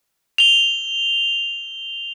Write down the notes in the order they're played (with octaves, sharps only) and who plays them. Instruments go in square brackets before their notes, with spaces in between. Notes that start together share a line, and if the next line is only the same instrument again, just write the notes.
[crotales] F7 G7